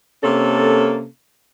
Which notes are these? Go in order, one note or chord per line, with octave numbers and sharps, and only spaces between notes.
C3 A#3 C#4 A4